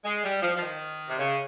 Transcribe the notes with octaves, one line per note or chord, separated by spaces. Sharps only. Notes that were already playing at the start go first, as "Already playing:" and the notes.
G#3
G3
F3
F3
D#3
C3
C#3